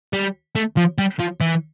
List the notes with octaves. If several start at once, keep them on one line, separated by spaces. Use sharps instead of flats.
G3
A3
F3
G3
F3
E3